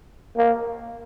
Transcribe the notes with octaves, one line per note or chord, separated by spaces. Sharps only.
A#3